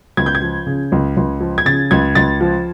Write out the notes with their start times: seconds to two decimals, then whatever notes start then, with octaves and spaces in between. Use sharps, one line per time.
0.17 C#2 G#6
0.26 G6
0.35 G#6
0.42 F3
0.67 C#3
0.92 C#2
1.17 C#2
1.41 F3
1.58 G#6
1.65 C#3 A6
1.91 C#2 G#6
2.15 C#2 A6
2.41 F3